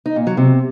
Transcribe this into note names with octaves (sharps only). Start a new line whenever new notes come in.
D#4
A#2
F#3
C3